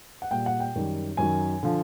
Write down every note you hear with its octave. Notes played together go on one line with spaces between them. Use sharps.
F#5
A#2 G3 G5
F#5
G5
F#2 D#3 G3
F#2 D#3 F#3 G#5
D3 F3